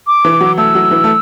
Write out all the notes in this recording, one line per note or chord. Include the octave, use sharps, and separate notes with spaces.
D6
E3
F#3
A3 E6
F#3
E3
A3